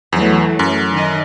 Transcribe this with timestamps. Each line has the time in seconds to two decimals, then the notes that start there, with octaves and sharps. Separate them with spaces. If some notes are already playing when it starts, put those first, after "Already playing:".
0.13 E2 E3 F#3 A3
0.59 F#2
0.91 D#3 D#5